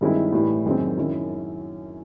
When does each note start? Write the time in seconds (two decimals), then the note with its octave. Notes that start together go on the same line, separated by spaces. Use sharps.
0.01 G2 D#3 G#3 C4 E4
0.33 A2 E3 G3
0.66 F#2 D#3 G#3 C4
0.97 F#2 D#3 G#3 C#4 E4